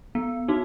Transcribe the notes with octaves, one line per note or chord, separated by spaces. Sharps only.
B3
D#4 F#4